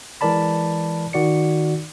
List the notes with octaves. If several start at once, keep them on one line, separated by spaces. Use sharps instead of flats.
E3 G#3 A#4 D5 A5 B5
D#3 F#4 D5 C#7